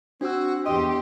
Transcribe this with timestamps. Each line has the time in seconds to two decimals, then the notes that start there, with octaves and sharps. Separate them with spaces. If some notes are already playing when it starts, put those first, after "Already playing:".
0.21 C4 D4 F#4 E6
0.65 E2 G4 D#5 C6